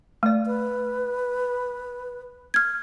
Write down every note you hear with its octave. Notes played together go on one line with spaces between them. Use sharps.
A3 D5
B4
F6 G#6